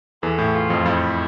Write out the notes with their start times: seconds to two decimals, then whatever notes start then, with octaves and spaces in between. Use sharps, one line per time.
0.23 E2 E3 A4
0.38 A2
0.54 F4
0.70 F2 F3
0.85 F2 F3 E4